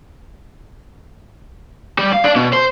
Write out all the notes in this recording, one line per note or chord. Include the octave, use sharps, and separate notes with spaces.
G3
F5
D4
B2
C5